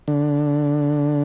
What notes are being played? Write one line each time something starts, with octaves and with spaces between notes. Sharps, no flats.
D3